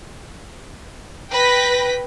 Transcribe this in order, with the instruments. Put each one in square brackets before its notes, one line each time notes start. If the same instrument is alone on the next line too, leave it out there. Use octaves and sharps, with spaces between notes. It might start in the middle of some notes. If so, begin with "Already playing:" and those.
[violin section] B4 G5 A#6 B6